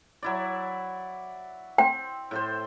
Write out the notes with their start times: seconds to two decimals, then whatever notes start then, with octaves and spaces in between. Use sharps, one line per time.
0.23 F#3 E4 D5
1.78 C4 G5
2.31 A2 A4 C5